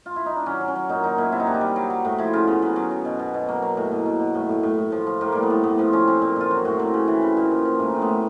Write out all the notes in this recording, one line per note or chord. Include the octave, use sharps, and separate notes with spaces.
F4
E4
D#4
D4
F#3 C#4
F#3
C#4
F#3
A#2 D#4
F#3 D#4
A#2 E4
C3 E4
D#4
C3 D4
D#4
G3
F#3
F#3
A2
F3 E4
C#3 F4
C#3 B3
F#3 B3
F#3
F#3
B2
B2
B2
F#3 A#3
F#3
A2
B2
B2
B2
A2
A2
A2
A2
F3
F3
A2 A#3
G3 A#3
B3
A2
A2 B3
F3 C4
F3 C#4
F3 C4
A#2
A#2 F4
F#3 F#4
A2 F#4
F#3 C4
C#3
E3
C#3
A#2
F3
F3
A2 A#3
A2 C4
B3
A2